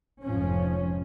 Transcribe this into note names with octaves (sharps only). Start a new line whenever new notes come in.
F1 G#2 F3 C#4